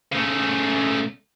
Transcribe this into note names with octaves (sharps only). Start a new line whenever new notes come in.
C#3 A3